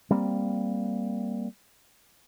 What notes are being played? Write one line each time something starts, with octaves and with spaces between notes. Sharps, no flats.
G3 A#3 C4